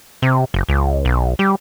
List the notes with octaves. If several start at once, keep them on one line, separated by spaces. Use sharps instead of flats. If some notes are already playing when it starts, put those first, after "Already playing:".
C3
F#1
C#2
B1
G3